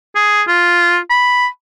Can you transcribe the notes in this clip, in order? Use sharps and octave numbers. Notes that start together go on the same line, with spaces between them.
G#4
F4
B5